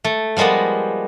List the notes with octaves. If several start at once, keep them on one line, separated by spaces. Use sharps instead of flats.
A3
F3 G3 G#3 A#3 B3